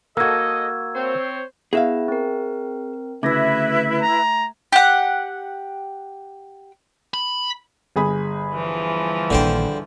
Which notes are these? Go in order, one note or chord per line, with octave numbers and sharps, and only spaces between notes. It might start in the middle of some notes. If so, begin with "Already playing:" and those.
A#3 F#4 A4 D#5 E6 G#6
C4 C5 C#5
B3 E4 G#4 E5 F5
C4 A#4
D2 C#3 A3 E4 B4 E5 G#6 A#6
A#5
G4 F#5
B5
G1 G#4 B5
E3 F3
A#1 D3 D#3 C5 G5